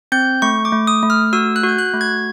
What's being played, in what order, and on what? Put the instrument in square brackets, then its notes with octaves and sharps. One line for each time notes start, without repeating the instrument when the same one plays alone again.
[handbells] C4 G6
A3 C#6
D6
A3
D#6
A3
F6
F#4 E6
F#6
F#4 G6
F#6
A3
G#6